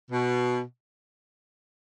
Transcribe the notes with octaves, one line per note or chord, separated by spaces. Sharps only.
B2